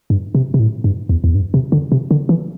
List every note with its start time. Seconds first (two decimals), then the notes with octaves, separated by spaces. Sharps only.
0.10 G2
0.35 C3
0.54 C3
0.60 A2
0.84 G2
1.09 E2
1.24 E2
1.35 G2
1.54 C3
1.72 D3
1.92 C3
2.11 D3
2.29 E3